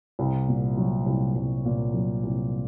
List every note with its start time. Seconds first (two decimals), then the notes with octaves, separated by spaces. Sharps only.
0.19 C2
0.48 A#2
0.77 F#3
1.06 C2
1.36 C2
1.65 A#2
1.94 F#3
2.23 C2